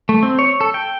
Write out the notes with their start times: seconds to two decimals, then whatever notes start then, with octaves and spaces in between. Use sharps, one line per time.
0.09 A3
0.23 C4
0.39 C#5
0.61 A4
0.74 G5